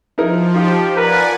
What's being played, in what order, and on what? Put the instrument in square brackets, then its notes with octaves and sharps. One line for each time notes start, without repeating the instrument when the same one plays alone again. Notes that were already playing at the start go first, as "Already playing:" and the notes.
[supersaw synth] F3 [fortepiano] D#4 E4 A#4
[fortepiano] D#4 F4 [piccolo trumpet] G4
[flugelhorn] A#4 [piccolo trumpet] B4 [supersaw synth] D5 F#5 G#5